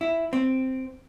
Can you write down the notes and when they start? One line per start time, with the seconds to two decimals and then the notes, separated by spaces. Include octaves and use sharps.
0.01 E4
0.33 C4